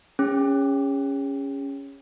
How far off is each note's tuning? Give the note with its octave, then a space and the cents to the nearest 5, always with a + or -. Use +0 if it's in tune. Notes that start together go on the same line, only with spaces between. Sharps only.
C#4 +0 G#4 -35